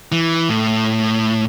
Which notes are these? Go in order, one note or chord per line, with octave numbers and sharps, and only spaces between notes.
E3
A2